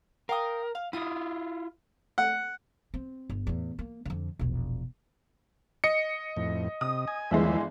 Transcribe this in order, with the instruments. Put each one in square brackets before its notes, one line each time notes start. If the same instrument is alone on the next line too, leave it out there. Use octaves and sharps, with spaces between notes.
[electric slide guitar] A#4 [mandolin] F5 G5 D#6
[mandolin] F5
[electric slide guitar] E4 F4 [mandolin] D#6
[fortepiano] F#5
[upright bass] C4
G1
E2 A2
A#3
F2 D3
E1 A#1
[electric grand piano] D#5 C#7
[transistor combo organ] F2 A2
[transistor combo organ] C3 [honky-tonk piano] D#6
[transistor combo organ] G#5
[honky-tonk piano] G1 E3 G#3 [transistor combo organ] D#2 F3 E5